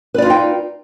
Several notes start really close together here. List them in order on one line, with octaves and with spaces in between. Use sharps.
B4 D5 F4 D#4 G5